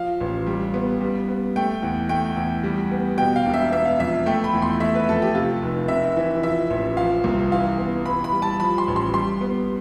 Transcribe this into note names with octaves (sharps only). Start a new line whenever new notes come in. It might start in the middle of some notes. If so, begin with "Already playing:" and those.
Already playing: F3 F5
A1
G3
B3
G3
B3
A3 G5
E2
A3 G5
E2
G3
B3
B2 G5
F5
E1
E5
B3 E5
F5
F2 E5
A3 G5
B5
E2
C6
A3 E5
B4
F2 A4
G4
C3 F4
F1
C3 E5
E3
F3 E5
A1
F3 F5
C2
E3 F5
B3
E3 B5
B5
G3
A5
F3 B5
C6
A1
C6
G3 C6
B3